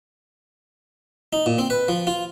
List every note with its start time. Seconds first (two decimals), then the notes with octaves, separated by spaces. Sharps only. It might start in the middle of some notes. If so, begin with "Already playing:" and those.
1.33 D#4
1.46 A#2
1.58 C4
1.70 B4
1.88 F3
2.07 F4